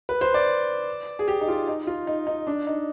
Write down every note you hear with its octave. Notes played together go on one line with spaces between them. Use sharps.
B4
C5
D5
G#4
G4
D#4
F4
D#4
F4
D#4
D#4
D4
D#4